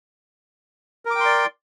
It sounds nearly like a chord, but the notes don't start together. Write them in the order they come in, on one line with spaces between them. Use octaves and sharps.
A#4 D6 G5 C6 D5